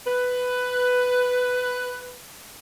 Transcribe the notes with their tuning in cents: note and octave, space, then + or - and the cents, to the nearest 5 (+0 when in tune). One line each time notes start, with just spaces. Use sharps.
B4 +10